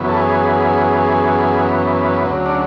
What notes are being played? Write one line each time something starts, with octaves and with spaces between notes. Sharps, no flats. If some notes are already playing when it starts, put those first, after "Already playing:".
Already playing: F#2 C#3 E3 B3
A4
G#4
D2 C#3 F#3
D4